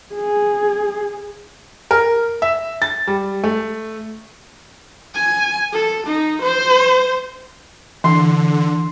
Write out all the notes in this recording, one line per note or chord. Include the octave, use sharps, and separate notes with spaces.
G#4
A#4
E5
A6
G3
A3
G#5
A4
D#4
C5
D3 E3 C6